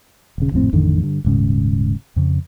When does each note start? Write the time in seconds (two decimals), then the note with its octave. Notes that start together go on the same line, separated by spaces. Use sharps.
0.38 D#1 C#3
0.52 G#1 F2 A2 C4
0.73 A1 F2 D3 D#3
1.02 G2 D3
1.25 D#1 G#2 C#3
2.16 F2 C#3